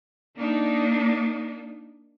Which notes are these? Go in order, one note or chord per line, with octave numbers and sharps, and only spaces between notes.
A#3 D4 D#4